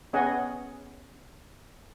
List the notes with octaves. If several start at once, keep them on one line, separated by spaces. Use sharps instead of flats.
B3 C#4 G#4 D#5 F#5 G#5